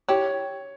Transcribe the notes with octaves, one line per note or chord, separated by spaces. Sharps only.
E4 G4 C#5